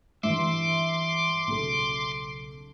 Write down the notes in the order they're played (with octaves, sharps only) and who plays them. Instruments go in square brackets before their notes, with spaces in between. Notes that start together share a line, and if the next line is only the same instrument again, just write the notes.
[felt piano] G2 E3 [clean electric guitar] E5 [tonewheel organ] C6 D6
[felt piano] B1 C#3 A4